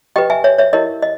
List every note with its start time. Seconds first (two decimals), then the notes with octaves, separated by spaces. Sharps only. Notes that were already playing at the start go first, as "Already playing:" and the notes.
0.16 G4 B4 D#5 G5
0.30 E5 G#5
0.44 C#5 E5
0.58 C#5 E5
0.73 E4 G4 A#4 C#5 D#5
1.02 D#5